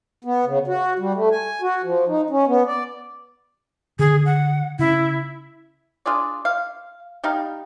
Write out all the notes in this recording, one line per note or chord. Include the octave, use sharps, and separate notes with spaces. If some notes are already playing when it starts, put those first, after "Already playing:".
B3
C#3
F#4
G3
A3
G#5
F#4
F3
D#4
C#4
B3
D5
D3 D#3 G#4
F#5
C#3 C#4 E4
D4 F4 G#4 D5
F5
G3 D#4 F5